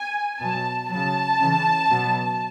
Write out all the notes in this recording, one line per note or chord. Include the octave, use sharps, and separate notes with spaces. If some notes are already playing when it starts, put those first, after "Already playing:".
Already playing: G#5
B2 F#3 A5
C#3 F#3 A5
C#3 E3
B2 F#3